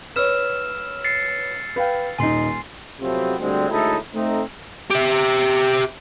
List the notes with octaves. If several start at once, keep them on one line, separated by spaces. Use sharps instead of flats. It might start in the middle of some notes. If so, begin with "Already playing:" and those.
B4 C#5 E6 F6 E7
A6 C7 C#7
B4 F5 G5
D#1 D#4 G#5 C6 C7
C3 F3 F#3 A3 B3 C4
D2 D3 G3 G#3 C4
D2 A2 G#3 D#4 E4 A4
A3 C4 D#4
G4 E5